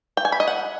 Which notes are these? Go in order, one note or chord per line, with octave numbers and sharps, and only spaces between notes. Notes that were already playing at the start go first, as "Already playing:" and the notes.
G5
G#5
B5
D#5
F#5